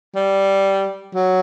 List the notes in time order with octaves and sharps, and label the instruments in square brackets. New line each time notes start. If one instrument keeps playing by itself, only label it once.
[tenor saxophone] G3
F#3